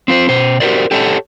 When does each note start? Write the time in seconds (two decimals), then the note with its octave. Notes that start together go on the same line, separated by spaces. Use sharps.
0.08 C4 F4 C5
0.29 B2 C5
0.60 F#4 G4 A#4 C5 D5
0.91 G4 A4 C#5 D#5 F#5 A5